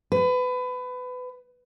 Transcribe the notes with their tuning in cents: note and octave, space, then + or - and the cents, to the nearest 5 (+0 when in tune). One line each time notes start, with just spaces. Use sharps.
B4 +25